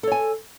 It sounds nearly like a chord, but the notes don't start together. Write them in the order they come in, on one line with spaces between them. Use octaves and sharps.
A4 C#5 G#5